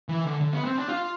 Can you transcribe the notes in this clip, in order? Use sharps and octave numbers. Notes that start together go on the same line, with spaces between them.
E3
D3
D3
B3
C4
D4
F4